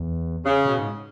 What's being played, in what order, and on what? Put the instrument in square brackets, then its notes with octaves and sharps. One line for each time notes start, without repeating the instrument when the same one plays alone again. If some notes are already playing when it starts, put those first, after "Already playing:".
Already playing: [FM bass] E2
[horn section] C#3
[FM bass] B2
G#2